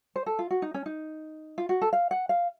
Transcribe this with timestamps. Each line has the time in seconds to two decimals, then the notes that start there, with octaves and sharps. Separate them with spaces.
0.16 C5
0.26 A4
0.39 F4
0.51 F#4
0.62 D#4
0.74 C#4
0.86 D#4
1.58 F4
1.69 F#4
1.82 A4
1.93 F5
2.11 F#5
2.29 F5